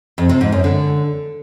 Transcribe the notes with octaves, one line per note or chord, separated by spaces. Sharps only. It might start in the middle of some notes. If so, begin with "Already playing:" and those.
F2
C3
G#2
F#2
D3